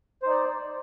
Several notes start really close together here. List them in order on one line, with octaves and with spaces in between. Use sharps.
C5 D#4 D5